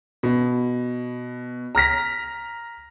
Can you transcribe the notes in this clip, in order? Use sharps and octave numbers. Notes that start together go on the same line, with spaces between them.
B2
A#5 F6 A#6 B6